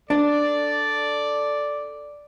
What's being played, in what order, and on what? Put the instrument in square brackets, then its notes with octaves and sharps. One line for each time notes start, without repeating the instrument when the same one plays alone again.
[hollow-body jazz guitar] D4 [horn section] A4 D5